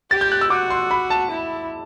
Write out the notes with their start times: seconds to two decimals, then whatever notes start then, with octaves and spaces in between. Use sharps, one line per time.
0.11 G4 A6
0.21 G6
0.32 F#6
0.41 E6
0.50 F#4 D6
0.70 C6
0.91 B5
1.10 A5
1.31 E4